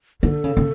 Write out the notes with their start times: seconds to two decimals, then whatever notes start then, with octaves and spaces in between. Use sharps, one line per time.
0.22 D3 A4
0.44 C#3
0.57 C#3